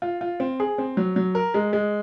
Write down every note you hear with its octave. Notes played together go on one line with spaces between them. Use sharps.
F4
F4
C4
G#4
C4
F#3
F#3
A#4
G#3
G#3